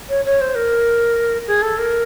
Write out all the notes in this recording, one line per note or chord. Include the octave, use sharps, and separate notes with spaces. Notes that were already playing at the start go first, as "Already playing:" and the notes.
C#5
C#5
C5
A#4
G#4
A4
A#4